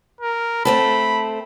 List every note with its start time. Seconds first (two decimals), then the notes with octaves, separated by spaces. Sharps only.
0.21 A#4
0.65 A3 C4 A4 B5